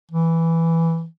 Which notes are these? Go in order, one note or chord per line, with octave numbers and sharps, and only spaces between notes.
E3